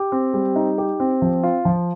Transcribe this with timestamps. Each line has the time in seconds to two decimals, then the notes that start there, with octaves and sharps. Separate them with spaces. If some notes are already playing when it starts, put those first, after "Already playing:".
Already playing: G4
0.12 C4
0.34 G3
0.56 D#4
0.78 G4
1.00 C4
1.22 F3
1.43 F4
1.65 F3